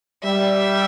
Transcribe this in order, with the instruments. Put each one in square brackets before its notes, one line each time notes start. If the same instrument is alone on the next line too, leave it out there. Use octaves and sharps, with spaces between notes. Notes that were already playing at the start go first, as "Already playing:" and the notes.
[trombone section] G3 [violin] E5